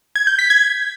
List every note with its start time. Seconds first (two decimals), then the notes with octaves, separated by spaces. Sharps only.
0.16 G#6
0.27 G6
0.39 B6
0.50 G#6